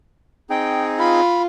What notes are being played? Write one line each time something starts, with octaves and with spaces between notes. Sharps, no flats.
C4 D#4 G#4 G5
F4 B5